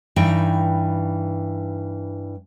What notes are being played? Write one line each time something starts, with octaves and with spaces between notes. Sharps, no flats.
G2 E3 D#4 G5